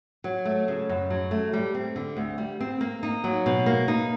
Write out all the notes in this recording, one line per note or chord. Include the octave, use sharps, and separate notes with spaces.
F#3
A3
C#3
F#2
F#3
A3
G3
C4
D3
D2
G3
C4
A#3
D#4
F#3
B2
A#3
D#4